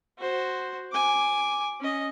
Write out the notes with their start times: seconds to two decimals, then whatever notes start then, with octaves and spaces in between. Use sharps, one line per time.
0.18 F#4 C5
0.92 G#5 D6
1.81 C#4 D#5